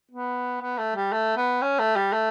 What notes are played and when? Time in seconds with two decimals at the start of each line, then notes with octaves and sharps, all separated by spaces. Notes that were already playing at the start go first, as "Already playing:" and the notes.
0.11 B3
0.61 B3
0.78 A3
0.96 G3
1.12 A3
1.37 B3
1.62 C#4
1.79 A3
1.96 G3
2.13 A3